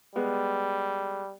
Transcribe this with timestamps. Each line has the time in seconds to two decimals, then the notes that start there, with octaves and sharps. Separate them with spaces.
0.16 G3 G#3 B3